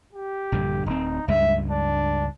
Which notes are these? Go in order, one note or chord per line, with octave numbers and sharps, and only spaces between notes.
G4
A#1 G2 D3
D1 C4 D#4
C#2 G2 G#3 E5
D4